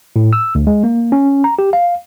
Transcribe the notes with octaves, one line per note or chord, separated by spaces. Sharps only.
A2
E6
D2
G#3
A#3
C#4
A#5
G4
F5